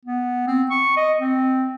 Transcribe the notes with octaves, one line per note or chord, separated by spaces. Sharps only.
B3
C4
C#6
D#5
C4